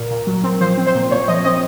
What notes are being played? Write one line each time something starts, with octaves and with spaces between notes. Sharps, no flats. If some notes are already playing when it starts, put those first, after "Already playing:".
Already playing: A#2 A#4
A#2
F#3
C4
F3 C5
C4
C5
A#2
A#2 C#5
F3 D#5
C4 D#5